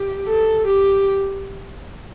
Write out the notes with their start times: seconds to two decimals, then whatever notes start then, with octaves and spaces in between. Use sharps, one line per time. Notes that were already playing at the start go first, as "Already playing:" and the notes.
Already playing: G4
0.28 A4
0.67 G4